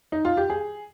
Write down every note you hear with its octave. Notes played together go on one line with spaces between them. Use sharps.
D#4
F4
G4
G#4